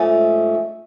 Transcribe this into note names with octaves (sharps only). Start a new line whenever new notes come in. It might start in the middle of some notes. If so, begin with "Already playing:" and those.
Already playing: G#2 F3 A3 C#4